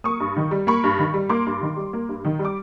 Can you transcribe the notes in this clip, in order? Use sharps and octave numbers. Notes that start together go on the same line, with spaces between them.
A#3 C#6 D#6
G2
D#3
G3
A#3 B5 C#6
G2
D#3
G3
A#3 C6 D6
G2
D#3
G3
A#3
G2
D#3
G3
D6